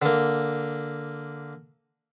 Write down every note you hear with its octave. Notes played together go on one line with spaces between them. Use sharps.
D3 A#3